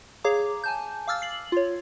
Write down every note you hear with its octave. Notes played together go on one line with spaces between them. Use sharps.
G#4 C#5 F5 A#5 D6
G#5 A5 G6
F5 D6 E6 F6 A6
C7 F#7
F4 C#5